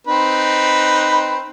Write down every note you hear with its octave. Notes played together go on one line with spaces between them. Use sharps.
C4 D#4 B4